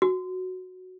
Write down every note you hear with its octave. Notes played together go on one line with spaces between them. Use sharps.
F#4